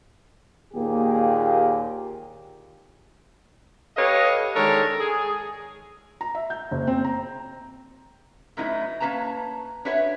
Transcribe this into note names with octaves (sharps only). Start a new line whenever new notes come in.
D#2 A#2 A#3 G4 G#4
G4 A4 B4 C#5 D#5 F5
D#3 G#3 D4 A4 A#4 C#5
G#4
A#5
E5
G6
F#1
C4
A#5
F#2 A2 F#3 B3 D#4 E4
A#3 C#4 B4 A5 A#5
D4 F#4 G4 B4 C#5 E5